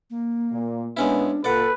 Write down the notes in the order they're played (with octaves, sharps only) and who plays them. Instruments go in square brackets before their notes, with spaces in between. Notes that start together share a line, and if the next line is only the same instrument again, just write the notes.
[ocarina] A#3
[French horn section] A#2
[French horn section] A#2 B3 [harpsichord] G#3 C#4 E4 [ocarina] D4
[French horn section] A#2 [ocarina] A4 [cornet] B4 [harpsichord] D5 F#5